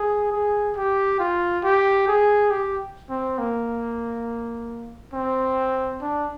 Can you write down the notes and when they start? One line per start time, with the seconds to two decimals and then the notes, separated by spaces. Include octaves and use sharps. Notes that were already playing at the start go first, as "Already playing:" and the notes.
Already playing: G#4
0.32 G#4
0.76 G4
1.19 F4
1.64 G4
2.08 G#4
2.51 G4
3.09 C4
3.38 A#3
5.13 C4
6.01 D4